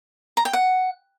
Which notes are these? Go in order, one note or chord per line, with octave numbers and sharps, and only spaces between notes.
A#5
G5
F#5